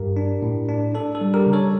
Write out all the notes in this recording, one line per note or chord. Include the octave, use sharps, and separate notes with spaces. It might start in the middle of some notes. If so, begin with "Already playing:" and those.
Already playing: G2 G4 A#4
D4
A2
D4
D4 A4
A4
G3
G4 A#4
C#3
A4 C#5